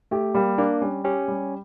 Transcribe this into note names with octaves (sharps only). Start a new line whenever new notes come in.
A3 G4
G3 A#3
A#3 D4
G3 C#4
C#4 G4
G3